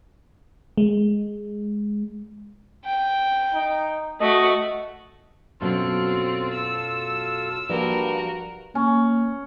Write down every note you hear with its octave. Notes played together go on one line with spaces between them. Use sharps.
G#3
G5
D#4
A3 F#4 D#5
F#2 B2 F#3 C4 F4 A4
E6
G2 F3 A#3 F#4 G4 A#4
A#3 C#4